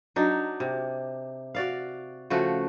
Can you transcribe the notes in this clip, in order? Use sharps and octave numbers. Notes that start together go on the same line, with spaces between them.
F#3 D4 D#4
C3
F#4 D5 F5
C#3 F3 A3 F#4